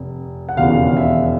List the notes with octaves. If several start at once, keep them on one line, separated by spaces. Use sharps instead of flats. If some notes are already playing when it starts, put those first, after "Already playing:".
Already playing: F1
F#5
E1 D#2 C#3 E3 F5
E5